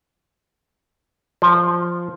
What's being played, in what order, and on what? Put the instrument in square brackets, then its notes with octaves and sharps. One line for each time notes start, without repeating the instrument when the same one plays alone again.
[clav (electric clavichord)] F3